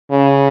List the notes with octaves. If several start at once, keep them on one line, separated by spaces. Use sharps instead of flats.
C#3